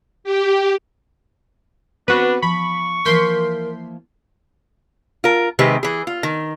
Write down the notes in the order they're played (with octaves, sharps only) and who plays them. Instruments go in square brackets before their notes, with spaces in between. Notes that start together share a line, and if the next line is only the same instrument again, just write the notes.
[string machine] G4
[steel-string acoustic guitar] B3 C4 C5 [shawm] D4 [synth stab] F#4 B4
[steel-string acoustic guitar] F3 [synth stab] B5 [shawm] C#6
[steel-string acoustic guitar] E3 F3 A#3 [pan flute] A#4 [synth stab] C6 G6 B6
[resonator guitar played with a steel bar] F4 A#4
C3 D#3 G#3 C4 G4 B4
E3 G#4
F4
D#3